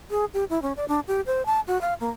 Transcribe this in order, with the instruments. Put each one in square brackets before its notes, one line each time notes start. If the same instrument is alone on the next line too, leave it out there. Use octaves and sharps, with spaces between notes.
[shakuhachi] G#4
G4
E4
C#4
D5
D4
G4
C5
A5
F#4
F5
A#3